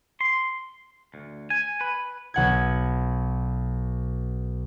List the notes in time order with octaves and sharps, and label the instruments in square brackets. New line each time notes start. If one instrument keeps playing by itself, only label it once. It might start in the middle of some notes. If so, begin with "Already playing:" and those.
[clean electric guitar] C6
D2
G#5
B4
[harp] B1 F#5 G#6